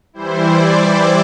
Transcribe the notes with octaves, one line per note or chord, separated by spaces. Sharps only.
E3 G3 E4 C5
D5
D5